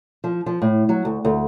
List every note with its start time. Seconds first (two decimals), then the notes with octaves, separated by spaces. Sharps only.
0.24 F3
0.46 F3
0.62 A2
0.89 F#3
1.05 D2
1.25 D2